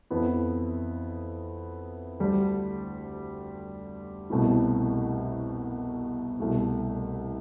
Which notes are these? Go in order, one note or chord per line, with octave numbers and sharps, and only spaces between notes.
F2 E3 B3 E4
D2 D3 G3
C2 B2 A3 C4 E4
C2 B2 A3